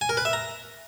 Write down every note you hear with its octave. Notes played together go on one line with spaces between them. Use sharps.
G#5
A#4
B4
E5
A#5